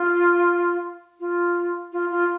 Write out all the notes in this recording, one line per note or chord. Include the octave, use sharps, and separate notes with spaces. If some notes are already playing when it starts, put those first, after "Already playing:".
Already playing: F4
F4
F4
F4